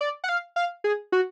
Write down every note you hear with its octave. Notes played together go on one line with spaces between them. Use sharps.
D5
F#5
F5
F5
G#4
F#4